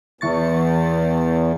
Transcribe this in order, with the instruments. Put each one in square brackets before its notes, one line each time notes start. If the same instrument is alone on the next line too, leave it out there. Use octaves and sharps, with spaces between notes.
[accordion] E2 [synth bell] E3 C#6 A6